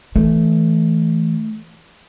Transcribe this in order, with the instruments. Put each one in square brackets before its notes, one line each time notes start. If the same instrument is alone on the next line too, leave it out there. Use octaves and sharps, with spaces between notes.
[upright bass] E3 [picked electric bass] A3